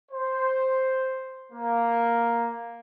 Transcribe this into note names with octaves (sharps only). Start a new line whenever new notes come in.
C5
A#3